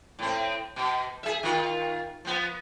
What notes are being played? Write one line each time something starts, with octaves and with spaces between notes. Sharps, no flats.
A2 C4
B2
G#4 E5
D#3 F4
F3 B3